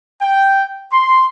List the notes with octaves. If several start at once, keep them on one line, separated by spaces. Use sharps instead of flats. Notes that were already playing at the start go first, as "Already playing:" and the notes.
G5
C6